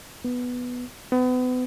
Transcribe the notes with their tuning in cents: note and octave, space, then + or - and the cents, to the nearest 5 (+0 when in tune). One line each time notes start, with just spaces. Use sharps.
B3 +0
B3 +35